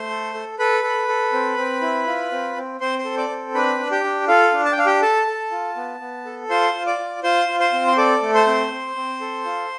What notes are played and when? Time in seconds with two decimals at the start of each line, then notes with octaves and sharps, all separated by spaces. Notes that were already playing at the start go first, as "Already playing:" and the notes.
Already playing: A3 C5 C6
0.10 A4
0.34 A4
0.59 A4 B4 B5
0.84 A4
1.08 A4
1.32 C4
1.57 C4
1.82 E4
2.07 F4
2.31 C4
2.56 C4
2.81 C4 C5 C6
2.99 C5 C6
3.05 A4
3.17 D5 D6
3.30 C4
3.54 D4 B4 B5
3.79 D4
3.91 G4 G5
4.04 D4
4.28 F4 A4 F5
4.53 D4
4.65 A5
4.72 G5
4.77 D4 F5
4.86 G4 G5
5.02 A4 A5
5.27 A4
5.51 F4
5.76 B3
6.00 B3
6.25 A4
6.49 F4 C5 C6
6.74 F4
6.86 D5 D6
6.98 F4
7.23 F4 C5 C6
7.49 F4
7.60 C5 C6
7.73 C4
7.87 C6
7.97 A4 D5 D6
8.22 A3
8.34 C5 C6
8.47 C4
8.71 C4
8.96 C4
9.21 A4
9.45 F4